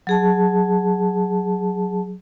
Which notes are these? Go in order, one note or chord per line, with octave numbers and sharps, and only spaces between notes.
F#3 G#4 A5